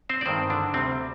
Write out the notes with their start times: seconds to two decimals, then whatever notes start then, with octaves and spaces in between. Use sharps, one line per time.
0.09 C4 C5
0.21 D5
0.26 G2 D#3 G#3 C4 C5
0.50 D3 D4
0.74 D2 C3 G3 C4